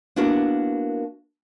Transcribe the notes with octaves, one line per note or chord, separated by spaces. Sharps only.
A#3 B3 D4 E4 F#4 A#4